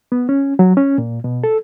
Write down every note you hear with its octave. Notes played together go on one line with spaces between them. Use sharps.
B3
C#4
F#3
C#4
A#2
B2
A4